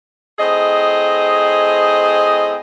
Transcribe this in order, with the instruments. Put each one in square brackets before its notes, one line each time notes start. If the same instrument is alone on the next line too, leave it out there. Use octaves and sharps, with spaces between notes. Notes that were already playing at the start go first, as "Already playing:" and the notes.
[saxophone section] A2 C4 G#4 D#5